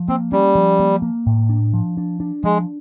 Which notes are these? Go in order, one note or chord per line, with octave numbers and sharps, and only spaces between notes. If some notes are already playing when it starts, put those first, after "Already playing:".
Already playing: F3
A#3 C4
G3 C#4
F3
A#3
A#3
A2
D4
F3
D4
D4
F3 G#3